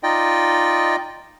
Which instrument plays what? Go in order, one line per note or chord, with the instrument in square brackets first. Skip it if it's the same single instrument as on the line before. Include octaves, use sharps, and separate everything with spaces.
[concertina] D#4 F4 D5 D#5 G5